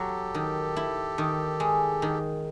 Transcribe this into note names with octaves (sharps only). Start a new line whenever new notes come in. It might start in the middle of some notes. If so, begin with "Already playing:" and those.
Already playing: F#3 G4 A4
D#3
E4
D#3
G#3
D#3